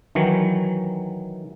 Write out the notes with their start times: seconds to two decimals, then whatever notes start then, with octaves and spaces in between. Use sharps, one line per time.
0.15 D#3 E3 F#3